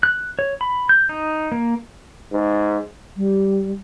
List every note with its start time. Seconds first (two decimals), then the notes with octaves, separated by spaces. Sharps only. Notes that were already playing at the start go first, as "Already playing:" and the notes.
0.03 F#6
0.39 C#5
0.61 B5
0.89 G6
1.09 D#4
1.52 A#3
2.32 G#2
3.17 G3